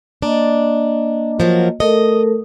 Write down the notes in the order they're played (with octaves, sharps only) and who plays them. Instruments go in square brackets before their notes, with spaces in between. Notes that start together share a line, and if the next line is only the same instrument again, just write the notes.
[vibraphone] A#3 D#5 [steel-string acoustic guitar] D4
[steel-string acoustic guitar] F3 F#3 A#4
[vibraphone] A3 A4 A#4 [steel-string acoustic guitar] D#5